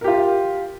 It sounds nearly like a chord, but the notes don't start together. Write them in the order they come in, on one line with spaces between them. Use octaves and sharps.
A#4 G4 F4